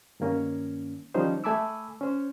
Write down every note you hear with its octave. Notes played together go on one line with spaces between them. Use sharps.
G2 D#3 A#3 C#4
D#3 F3 G3 C#4 D#4 C5
A3 G#5 A5 B5 D6 E6
C#4 C5